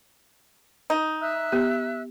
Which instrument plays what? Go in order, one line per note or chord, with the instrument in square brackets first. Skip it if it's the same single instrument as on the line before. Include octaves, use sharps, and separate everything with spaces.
[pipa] D#4
[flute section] E5 E6 F#6
[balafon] B3 G4